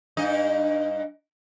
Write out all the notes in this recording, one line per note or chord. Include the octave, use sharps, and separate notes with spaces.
G2 D#4 D#5